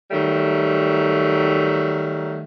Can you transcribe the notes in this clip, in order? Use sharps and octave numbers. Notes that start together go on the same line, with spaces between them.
D#3 F#3 G3 A3